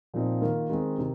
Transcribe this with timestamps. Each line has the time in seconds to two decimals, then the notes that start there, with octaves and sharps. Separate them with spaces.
0.14 A#2 F3 C4 D#4
0.41 D#3 A#3 F4
0.70 D#3 G#3 C4
0.98 C3 D#3